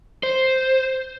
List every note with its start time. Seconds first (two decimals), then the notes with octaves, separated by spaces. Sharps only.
0.23 C5